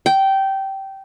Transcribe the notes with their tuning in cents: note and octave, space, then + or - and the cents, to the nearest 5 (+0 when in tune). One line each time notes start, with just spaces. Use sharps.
G5 -15